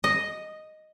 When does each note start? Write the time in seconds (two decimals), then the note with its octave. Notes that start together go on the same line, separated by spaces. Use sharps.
0.04 D#5